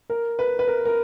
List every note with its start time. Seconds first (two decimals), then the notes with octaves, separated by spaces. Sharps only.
0.10 A#4
0.39 B4
0.59 B4
0.67 A#4
0.85 A#4